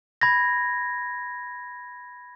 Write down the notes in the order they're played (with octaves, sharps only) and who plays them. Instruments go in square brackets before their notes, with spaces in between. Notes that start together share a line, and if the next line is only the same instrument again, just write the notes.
[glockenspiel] B5 G#6 A#6